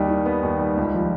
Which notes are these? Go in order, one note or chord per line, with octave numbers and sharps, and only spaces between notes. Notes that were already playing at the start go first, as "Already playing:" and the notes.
Already playing: D#2 G3 D#4
D#3
B3
D#2
G3
C#2
F3